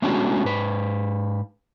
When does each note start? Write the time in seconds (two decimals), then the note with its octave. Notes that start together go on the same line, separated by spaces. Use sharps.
0.02 G#3 A3 B3 C#4 D4 F#4
0.44 G#2 B4